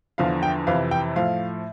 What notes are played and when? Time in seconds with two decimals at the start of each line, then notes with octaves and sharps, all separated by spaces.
0.18 E2 D3 F3 F5
0.43 G5
0.67 F2 C3 E3 F5
0.91 G5
1.16 A2 F3 F5